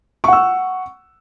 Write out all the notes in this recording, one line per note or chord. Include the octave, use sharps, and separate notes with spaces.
F#5 C#6 E6